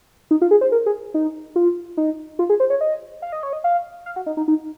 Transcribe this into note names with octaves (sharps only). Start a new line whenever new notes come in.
D#4
F4
G#4
C5
A#4
G#4
D#4
F4
D#4
F4
G#4
C5
C#5
D#5
F5
D#5
C#5
D#5
F5
F5
F#4
D#4
D#4
D#4